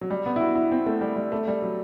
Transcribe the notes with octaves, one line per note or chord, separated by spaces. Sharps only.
F#3
G3
B3
E4
F#4
E4
C4
A3
G3
G3
A3
G3
F#3